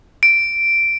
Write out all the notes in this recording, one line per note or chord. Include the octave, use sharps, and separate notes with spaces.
D7